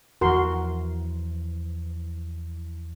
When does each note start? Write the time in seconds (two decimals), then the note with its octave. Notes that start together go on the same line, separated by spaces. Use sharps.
0.21 E2 E3 F3 F#4 A#4 C6